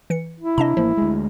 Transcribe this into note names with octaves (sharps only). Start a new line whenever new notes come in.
E3 C#7
E4
C3 D4 D#5 A5 A#5
A1 F3 A#3
D2 G#3